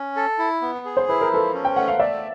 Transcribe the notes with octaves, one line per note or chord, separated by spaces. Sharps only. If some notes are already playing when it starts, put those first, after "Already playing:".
Already playing: C#4
A4
E4
B3
G#4
C5
E4 B4
A#4
F3 A4 B4
C#4
G5
A3 F#5
F5
A3 D5 E5